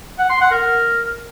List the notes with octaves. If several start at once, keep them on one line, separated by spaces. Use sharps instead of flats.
F#5
C6
F#5
A#4